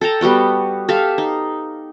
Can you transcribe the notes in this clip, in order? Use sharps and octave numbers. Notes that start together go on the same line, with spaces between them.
A4 G5 A5 A#5
G3 B3 F#4 G5
G4 A4 E5 F5
D#4